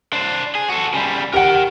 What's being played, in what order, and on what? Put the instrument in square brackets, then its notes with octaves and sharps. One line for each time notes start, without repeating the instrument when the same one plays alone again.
[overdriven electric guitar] D4 C5
G#4
F#4 A4
C#3 G3
[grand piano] G4 F#5 [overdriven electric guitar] A#4 G5